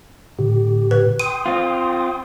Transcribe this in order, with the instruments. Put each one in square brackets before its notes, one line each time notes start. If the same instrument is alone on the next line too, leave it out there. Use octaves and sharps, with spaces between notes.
[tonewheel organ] A2 D3 G4
[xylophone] B4
[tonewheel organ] G5 C6 D#6 [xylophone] D#7
[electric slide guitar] C4 F4